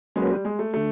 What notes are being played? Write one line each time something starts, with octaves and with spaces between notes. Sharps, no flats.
F#3 G#3 A#3 C#4 F#4 B4
G3
G#3
A3
D3 A3